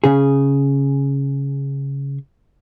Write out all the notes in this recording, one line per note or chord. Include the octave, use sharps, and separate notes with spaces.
C#3 G#4